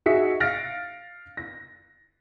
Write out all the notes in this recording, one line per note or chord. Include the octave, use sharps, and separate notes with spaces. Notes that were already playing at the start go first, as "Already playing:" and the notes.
D#4 F#4 G#4 E5 B6 C#7
F5 F6 A6 A#6 D7
A#6